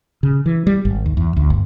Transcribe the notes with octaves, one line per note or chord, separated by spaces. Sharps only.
C#3
E3
G3
G#1
D#2
E2
D2
G1